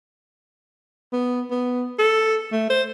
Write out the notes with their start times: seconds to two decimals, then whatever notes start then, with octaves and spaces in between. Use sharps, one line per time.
1.13 B3
1.50 B3
1.99 A4
2.52 A3
2.70 C5